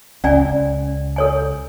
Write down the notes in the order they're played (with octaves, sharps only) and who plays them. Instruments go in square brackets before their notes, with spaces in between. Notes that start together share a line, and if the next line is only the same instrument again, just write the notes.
[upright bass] C#2 [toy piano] C#4 D5 G#5
[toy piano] A4 C#5 G#5